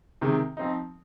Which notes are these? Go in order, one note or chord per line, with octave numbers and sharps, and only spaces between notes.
C3 D#3 G#3
F3 C4 D#4